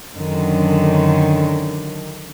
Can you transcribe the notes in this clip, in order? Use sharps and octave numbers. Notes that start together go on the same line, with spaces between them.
F#2 D3 D#3